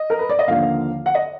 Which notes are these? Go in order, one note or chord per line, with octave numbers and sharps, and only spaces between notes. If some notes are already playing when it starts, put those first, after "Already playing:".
Already playing: D#5
A#4
B4
D5
D#5
D#2 D3 F3 A#3 F5
F#5
D#5